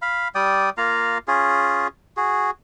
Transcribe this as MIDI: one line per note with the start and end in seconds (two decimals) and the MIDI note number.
0.02 0.28 77
0.02 0.28 83
0.35 0.70 55
0.35 0.70 74
0.35 0.70 79
0.35 0.70 87
0.77 1.18 58
0.77 1.18 65
0.77 1.18 77
0.77 1.18 82
1.28 1.88 61
1.28 1.88 65
1.28 1.88 68
2.17 2.51 66
2.17 2.51 68